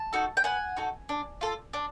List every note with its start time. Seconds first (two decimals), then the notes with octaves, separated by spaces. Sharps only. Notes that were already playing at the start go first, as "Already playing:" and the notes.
Already playing: A5
0.13 D#4 F#4 A4
0.37 G5
0.44 B3 F#5 G#5
0.77 D#4 F#4 A4
1.09 D4
1.41 F4 A4
1.73 D4